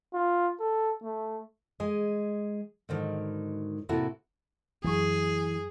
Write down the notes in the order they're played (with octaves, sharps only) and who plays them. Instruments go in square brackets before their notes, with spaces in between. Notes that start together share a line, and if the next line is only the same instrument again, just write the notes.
[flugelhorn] F4
A4
A3
[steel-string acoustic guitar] G#3 G#4 D#5
G#2 D3 D#3 F#3
A2 C3 A#3 E4 F#4 A4
[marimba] F#2 F#3 C#6 [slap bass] E3 [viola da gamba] G#4